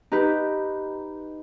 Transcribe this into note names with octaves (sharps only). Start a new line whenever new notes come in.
D#4 G4 B4